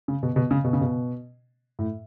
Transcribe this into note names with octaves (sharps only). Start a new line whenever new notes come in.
C#3
B2
B2
C#3
B2
C#3
B2
A2